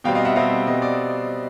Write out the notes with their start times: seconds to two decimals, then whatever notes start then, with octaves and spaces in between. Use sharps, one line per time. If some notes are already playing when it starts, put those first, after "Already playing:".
0.04 B2 G3 C4 F5 G5
0.15 D#5 F5
0.25 E5 F#5
0.35 B2 G3 C4 D#5 F5
0.67 B2 G3 C4 D#5
0.82 D5